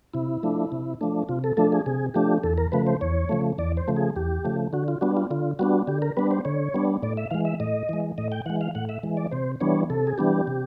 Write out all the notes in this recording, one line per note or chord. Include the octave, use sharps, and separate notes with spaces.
C3 E4
F3 A3 D4
C3
F3 A3 D4
C3 F4
A4
F3 A3 D4 A4
G#4
C3 G#4
F3 A3 D4 G4
E2 A4
A#4
C#3 F3 A3 B4
C5
E2 C#5
C#3 F3 A3
E2 D5
C5
C#3 F3 A3
G#4
E2 G4
C#3 F3 A3
D3 F#4
F4
G3 B3 D4 F#4
F4
D3 F4
G3 B3 D4 F#4
D3 G4
A#4
G3 B3 D4 B4
C5
D3 C#5
G3 B3 D4
A2 D5
E5
E3 G#3 F5
E5
A2 D#5
E3 G#3
A2 D#5
G5
E3 G#3 F#5
F5
A2 F#5
E5
E3 G#3
D5
C3 C5
E3 G3 B3 D4 C#5
C3 A4
G#4
E3 G3 B3 D4 G4
C3